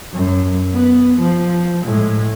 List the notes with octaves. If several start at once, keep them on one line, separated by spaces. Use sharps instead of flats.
F#2
B3
F3
A2 G#3